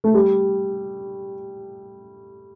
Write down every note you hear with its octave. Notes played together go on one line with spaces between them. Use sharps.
A3
G3